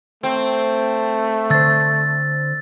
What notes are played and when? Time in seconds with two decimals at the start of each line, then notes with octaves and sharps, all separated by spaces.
0.23 A3 C4
1.50 D3 C5 E6 A6